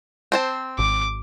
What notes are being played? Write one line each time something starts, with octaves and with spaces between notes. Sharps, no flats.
C4 C5 A5
G#1 D6